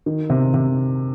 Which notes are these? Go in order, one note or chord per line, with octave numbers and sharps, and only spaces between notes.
D#3
C3
C3